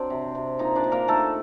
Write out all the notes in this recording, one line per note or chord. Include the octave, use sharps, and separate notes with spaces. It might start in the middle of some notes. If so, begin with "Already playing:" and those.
Already playing: F#3 C4 D4 C5 D5
C3
C3
A#2 D#4 D#5
D4 D5
A#2
A#3 A#4
D#3 A3 A4